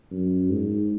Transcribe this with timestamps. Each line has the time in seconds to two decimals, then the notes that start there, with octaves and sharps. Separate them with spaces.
0.11 F#2
0.50 G#2